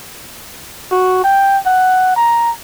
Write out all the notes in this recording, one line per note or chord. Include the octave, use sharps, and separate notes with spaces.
F#4
G5
F#5
A#5